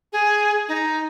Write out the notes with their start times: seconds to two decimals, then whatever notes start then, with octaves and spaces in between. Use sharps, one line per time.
0.13 G#4
0.68 D#4